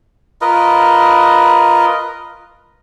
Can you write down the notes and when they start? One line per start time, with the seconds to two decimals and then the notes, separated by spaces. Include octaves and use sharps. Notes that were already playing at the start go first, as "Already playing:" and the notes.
0.41 F4 A#4 B4 D#5